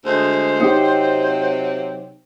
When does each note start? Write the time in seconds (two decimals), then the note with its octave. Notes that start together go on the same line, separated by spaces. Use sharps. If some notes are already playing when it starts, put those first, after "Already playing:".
0.05 D2 G#3 C5
0.60 C3 F#3 C4 D#4 G4